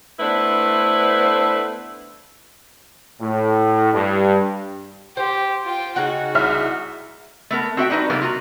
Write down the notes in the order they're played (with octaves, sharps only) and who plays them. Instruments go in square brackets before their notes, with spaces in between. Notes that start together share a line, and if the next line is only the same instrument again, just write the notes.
[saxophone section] A3 B3 D4 E4 B4 C5
[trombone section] A2
G2
[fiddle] G4 [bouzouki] C5
[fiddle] F4 G5
[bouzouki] C#3 D#4 F#5 [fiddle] F#4
[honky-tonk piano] C2 E5 F6
[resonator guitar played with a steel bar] A3 B3 A#4
C4 F#4 E5 G5
G3 D4 D#4 F#4 B4
C3 G3 A#3 B3
F4 F#4 A#5